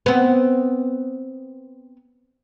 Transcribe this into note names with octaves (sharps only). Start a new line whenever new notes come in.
B3 C4